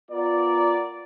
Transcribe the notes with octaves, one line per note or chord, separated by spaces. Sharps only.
B3 F4 A#4 D5